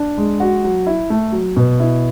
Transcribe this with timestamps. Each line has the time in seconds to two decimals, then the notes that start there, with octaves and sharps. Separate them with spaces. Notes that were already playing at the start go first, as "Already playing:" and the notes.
Already playing: D4
0.18 G#3
0.40 F#4
0.64 F#3
0.86 E4
1.10 A3
1.32 F#3
1.57 B2
1.80 E4